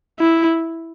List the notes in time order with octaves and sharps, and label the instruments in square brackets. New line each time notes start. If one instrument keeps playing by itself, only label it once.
[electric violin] E4